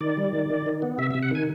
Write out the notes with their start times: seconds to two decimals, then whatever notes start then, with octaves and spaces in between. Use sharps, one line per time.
0.01 D#3 D5
0.17 G3
0.33 D#3
0.50 D#3
0.66 D#3
0.82 B3
0.98 C3 E5
1.11 E5
1.15 C3
1.23 F#5
1.31 D#3 G#5